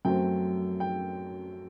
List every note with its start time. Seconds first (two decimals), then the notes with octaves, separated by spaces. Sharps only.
0.05 F#2 F#3 A3 C4 G5
0.80 G5